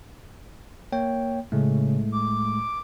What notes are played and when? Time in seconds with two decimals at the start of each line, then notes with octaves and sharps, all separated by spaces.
0.92 A#3 C#5 G5
1.52 A2 C#3 G#3 A3
2.12 D6